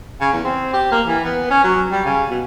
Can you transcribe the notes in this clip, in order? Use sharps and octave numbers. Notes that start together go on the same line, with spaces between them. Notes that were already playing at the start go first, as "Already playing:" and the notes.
C#3
E2
C4
G4
A#3
E3
B3
C#4
F#3
G3
C#3
B2